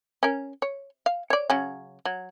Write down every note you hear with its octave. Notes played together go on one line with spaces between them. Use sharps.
C#4 A#4
C#5
F5
C#5 D5
C#3 F#3 C#4
F#3